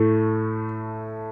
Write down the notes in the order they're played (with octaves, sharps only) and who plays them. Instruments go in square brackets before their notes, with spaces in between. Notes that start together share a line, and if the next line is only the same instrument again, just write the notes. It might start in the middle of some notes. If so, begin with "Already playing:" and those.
Already playing: [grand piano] A2 A3